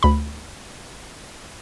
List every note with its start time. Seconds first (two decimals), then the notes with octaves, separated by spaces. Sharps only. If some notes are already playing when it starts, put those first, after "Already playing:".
0.03 D2 B5